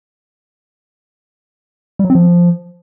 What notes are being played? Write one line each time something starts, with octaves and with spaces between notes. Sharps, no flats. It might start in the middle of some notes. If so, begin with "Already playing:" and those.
G3
F#3
C4
F3